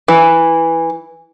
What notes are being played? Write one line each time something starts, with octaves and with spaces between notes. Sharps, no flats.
E3